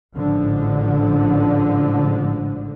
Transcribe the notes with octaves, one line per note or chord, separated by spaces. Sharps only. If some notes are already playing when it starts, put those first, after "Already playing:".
A1 G#2 D3 F3